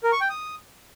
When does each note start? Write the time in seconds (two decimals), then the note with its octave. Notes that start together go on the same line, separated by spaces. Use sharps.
0.04 A#4
0.12 C#6
0.21 G5
0.30 D#6